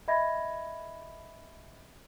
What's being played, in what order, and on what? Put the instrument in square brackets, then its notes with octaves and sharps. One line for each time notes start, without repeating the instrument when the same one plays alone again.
[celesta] D#5 E5 B5 G#6 A#6